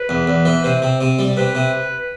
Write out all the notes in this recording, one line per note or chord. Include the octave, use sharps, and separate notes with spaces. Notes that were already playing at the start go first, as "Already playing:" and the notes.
Already playing: B4
E2
E2
E3
C3 C5
C3
C3
G3
C3 B4
C3